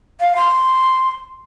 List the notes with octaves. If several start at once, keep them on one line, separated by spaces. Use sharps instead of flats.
F5
C6